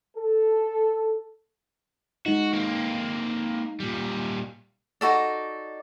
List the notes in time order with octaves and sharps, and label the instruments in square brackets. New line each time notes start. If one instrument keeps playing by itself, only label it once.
[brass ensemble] A4
[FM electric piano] G#3 D#4 [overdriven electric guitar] F#4
[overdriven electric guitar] A#3 C4
A#2 G3
[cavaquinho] D#4 F#4 A4 D5